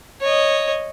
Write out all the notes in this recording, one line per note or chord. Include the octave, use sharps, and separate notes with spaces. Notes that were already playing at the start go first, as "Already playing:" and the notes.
C#5 D#5